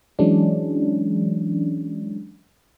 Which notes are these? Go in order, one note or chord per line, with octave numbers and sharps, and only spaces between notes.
E3 F#3 G#3 C#4 D4